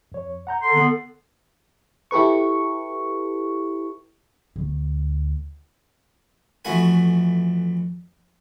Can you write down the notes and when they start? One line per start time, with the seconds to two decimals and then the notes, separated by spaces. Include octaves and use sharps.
0.12 F2 C#5
0.47 F#5 A#5 G6
0.62 A4 C6
0.74 D3 B3
2.11 E4 G4 A4 B4 C#6
4.56 D2
6.65 F2 E3 A3 F#4 B4 G#5